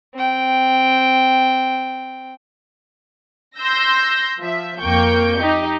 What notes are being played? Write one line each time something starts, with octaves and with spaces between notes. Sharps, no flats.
C4 G5
C6 E6 G6 A#6
F3 E5
F2 A#3 G5 C#6 G6
D#4 G4